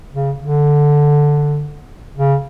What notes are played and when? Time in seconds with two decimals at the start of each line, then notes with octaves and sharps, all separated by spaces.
0.14 C#3
0.39 D3
2.17 C#3